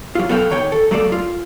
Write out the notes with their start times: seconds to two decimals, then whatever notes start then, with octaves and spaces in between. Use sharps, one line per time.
0.15 F#3 F4
0.29 B3 F#4 A4 F5 G5
0.50 D#3 C#5 G5
0.72 A4
0.91 F#3 A3 A#3 A4 D5
1.12 F4